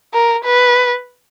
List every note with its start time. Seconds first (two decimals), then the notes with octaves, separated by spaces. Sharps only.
0.14 A#4
0.45 B4